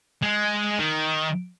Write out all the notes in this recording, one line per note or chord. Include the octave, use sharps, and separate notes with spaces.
G#3
D#3